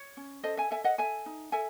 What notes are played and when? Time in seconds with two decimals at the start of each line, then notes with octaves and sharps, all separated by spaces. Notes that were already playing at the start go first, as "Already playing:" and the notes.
Already playing: C#5
0.17 C#4
0.44 A4 C5 D#5
0.57 E5 G#5
0.71 A4 E5 G#5
0.84 D#5 F#5
0.98 A4 E5 G#5
1.26 D#4
1.52 A4 E5 G#5